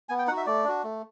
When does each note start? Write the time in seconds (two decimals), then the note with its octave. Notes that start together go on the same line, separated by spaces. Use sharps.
0.09 B3 G#5
0.19 G5
0.27 D#4 F#5
0.32 F#4
0.37 E5
0.46 A3 D5
0.64 D4 F#4
0.84 A3